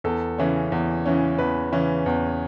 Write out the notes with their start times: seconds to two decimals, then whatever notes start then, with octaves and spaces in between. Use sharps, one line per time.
0.04 E2 A4
0.38 C#3 E3 C#4
0.72 E2
1.05 C#3 E3 C#4
1.38 E2 B4
1.72 C#3 E3 C#4
2.06 E2